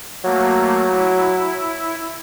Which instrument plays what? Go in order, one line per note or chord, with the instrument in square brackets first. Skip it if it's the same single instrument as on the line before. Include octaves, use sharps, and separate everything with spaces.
[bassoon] F#3 [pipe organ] A3 A#3
[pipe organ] E4